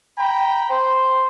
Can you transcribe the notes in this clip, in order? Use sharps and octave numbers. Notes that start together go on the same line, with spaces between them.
G5 A#5 B5
C5